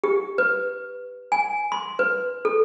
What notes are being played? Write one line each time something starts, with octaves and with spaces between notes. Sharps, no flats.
G4
B4
G#5
C6
B4
A4